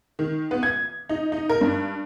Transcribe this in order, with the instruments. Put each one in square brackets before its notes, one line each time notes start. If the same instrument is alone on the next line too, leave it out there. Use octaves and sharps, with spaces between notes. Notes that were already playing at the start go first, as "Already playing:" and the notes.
[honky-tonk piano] D#3
B3
G#6
D#4
D#4
A#4
G2